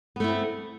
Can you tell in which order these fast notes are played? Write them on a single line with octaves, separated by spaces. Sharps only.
B3 A3 E4 C4